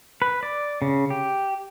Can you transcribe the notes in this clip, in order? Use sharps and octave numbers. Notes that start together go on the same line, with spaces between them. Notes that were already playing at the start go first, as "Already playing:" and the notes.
B4
D5
C#3
G4